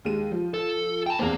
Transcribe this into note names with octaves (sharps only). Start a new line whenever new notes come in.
D#2 G#3 D#7
F3
A4
G5 A5
E2 A#3 C4